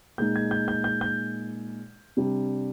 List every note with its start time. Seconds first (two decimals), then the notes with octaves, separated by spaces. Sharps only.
0.18 A#2 G#3 D#4 G6
0.36 G#6
0.51 G6
0.68 G6
0.84 G6
1.01 G6
2.17 C3 G3 D4